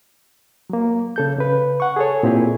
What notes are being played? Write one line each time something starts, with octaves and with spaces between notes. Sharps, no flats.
F#3 A#3
C#3 A4 G6
C#3 B4
F#5 C#6
G#4 A4 C#5
A#2 C4 E4 G4 G#4